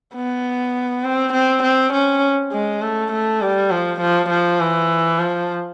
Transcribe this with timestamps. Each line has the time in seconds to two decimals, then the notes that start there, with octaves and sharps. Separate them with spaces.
0.16 B3
1.05 C4
1.34 C4
1.64 C4
1.93 C#4
2.52 G#3
2.82 A3
3.12 A3
3.41 G3
3.71 F3
4.01 F3
4.30 F3
4.60 E3
5.19 F3